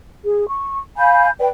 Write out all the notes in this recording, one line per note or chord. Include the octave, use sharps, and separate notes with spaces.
G#4
C#6
F5 G#5 B5 G6
B4 D5 G5